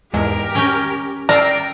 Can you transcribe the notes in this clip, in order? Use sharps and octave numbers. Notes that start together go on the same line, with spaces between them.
E2 G#2 G#3 G4 A#4
C#4 G5
A#4 D5 G5 A#5 E6 C7 D7